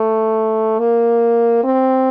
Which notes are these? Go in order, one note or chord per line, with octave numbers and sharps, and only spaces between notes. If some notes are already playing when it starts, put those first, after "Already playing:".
Already playing: A3
A#3
C4